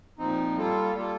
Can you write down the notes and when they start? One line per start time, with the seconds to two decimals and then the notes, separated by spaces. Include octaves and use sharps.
0.18 A#2 F3 C4 D#4
0.56 G3 A#3 F4 A4
0.94 G3 A#3 F4 A4